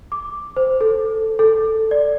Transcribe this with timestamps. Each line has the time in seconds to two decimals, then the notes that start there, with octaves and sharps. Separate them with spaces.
0.12 D6
0.57 C5
0.81 A4
1.39 A4
1.91 D5